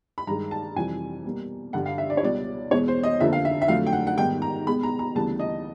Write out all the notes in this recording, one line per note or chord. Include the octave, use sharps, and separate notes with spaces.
B5
G2 D#3 G#3 A#5
A5
F2 C3 E3 G3 G#5
B2 G3 A#3
G2 D3 G3 F#5
F5
E5
D5
C#5
C#2 B2 G3 B3 D5
E2 B2 G#3 B3 C#5
C5
D#5
F2 D3 F3 A#3 E5
F5
E5
E5
F2 D3 F#3 A3 F5
G5
F#5
F#5
G#2 D#3 G3 B3 G5
A#5
B2 G#3 B3 B5
A#5
A#5
D2 C#3 E3 G3 B3 A5
D#5